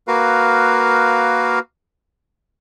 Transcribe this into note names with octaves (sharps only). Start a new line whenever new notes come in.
A#3 F#4 A#4 B4 F5